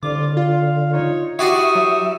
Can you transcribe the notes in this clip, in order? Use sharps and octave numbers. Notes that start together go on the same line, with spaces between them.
C2 A2 D3 F4 D6
F4 F5
D#4 C#5
E4 F#4 G4 D5 E5 C#6 D#6 C7
F#3